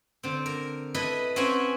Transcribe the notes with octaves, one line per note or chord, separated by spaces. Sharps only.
D3 C4
A#4
E4 A4 B4 D#5
C4 C#4 F#4 B4 F#5 G#5